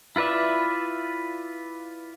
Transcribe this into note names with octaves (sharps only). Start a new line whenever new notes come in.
E4 F4 B4 D5 E5